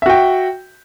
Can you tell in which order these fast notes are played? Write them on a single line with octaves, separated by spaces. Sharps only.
E5 F#4 G5